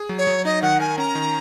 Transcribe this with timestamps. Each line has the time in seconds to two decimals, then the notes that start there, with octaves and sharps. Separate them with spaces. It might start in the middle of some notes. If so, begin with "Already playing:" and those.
Already playing: G#4
0.09 F#3
0.18 C#5
0.27 F#3
0.45 D#4 D#5
0.62 D#3 F#5
0.80 A#4 G#5
0.98 C#4 A#5
1.15 D#3